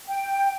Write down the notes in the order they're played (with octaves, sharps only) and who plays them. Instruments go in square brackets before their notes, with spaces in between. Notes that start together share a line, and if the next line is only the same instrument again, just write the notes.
[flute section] G5